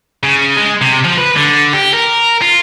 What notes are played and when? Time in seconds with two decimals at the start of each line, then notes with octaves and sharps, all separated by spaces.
0.23 C#3
0.57 G#3
0.81 C3
1.04 F3
1.18 B4
1.36 D3
1.73 G4
1.93 A#4
2.42 F4